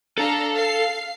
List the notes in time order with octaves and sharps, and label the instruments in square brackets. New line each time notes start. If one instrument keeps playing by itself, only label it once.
[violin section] D4 F5 A#5 [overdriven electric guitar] A4
[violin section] F5 C7